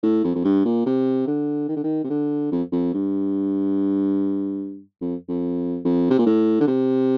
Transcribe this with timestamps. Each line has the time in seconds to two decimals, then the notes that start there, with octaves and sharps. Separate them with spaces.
0.03 A2
0.24 F2
0.35 F2
0.45 G2
0.65 A#2
0.86 C3
1.27 D3
1.68 D#3
1.76 D3
1.84 D#3
2.04 C3
2.10 D3
2.52 F2
2.72 F2
2.94 G2
5.01 F2
5.29 F2
5.85 F2
6.10 C3
6.19 A#2
6.26 A2
6.61 D3
6.67 C3